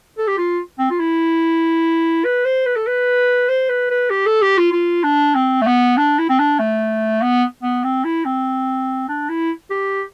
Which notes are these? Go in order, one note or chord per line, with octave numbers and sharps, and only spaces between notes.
A4
G4
F4
C4
F4
E4
B4
C5
B4
A4
B4
C5
B4
B4
G4
A4
G4
F4
F4
D4
C4
A3
B3
D4
E4
C4
D4
A3
B3
B3
C4
E4
C4
D4
E4
G4